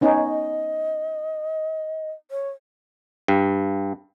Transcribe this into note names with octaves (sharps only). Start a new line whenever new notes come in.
B3 C#4 D#4 D#5
C#5
G2